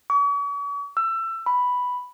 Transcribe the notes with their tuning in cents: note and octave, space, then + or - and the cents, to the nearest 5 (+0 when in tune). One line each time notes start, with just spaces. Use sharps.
C#6 +45
E6 +25
B5 +0